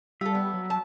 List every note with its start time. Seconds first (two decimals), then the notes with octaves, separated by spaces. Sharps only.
0.21 G3 F4 A4 E5
0.35 B3
0.54 F#3
0.70 A5